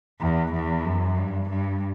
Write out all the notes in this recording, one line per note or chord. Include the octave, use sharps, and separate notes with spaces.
E2
E2
F#2
G2
G2